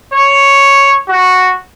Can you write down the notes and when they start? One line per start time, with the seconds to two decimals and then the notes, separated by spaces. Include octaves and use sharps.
0.13 C#5
1.08 F#4